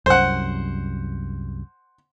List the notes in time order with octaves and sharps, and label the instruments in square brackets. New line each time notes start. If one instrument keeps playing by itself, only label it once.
[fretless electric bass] C2 F#2 [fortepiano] C5 F#5